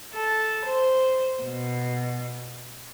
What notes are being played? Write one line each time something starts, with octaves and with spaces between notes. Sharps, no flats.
A4
C5
B2